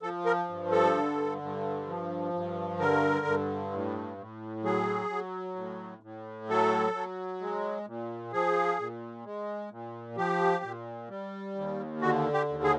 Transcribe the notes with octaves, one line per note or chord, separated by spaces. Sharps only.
F3 A4
A#4
G2
A4
D3
G2
F3
G2
D3 A#4
G2
A2
A2
F#3 G#4
F#3
A2
A2
F#3 A4
F#3
G#3
A#2
F3 G#4
A#2
G#3
A#2
F3 G4
A#2
G3
D#2
D3 F#4
G4
D#2
G#4